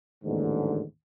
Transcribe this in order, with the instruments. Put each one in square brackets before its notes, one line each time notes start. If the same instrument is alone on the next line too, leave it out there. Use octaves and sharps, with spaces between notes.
[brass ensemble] A1 D#2 G#2 D3